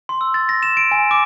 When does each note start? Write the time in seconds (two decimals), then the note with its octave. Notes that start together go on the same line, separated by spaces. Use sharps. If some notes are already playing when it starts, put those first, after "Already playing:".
0.09 C6
0.21 E6
0.34 A6
0.49 A#6
0.63 E7
0.77 D7
0.91 G#5
1.11 D6